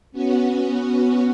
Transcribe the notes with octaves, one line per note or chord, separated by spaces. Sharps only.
B3 C#4 F#4